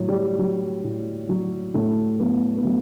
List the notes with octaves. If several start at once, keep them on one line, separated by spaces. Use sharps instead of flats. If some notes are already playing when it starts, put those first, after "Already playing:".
Already playing: A2 F#3 C#5
G3
F#3
A2
F#3
A2 A3
F#3 B3
B3
F#3 A3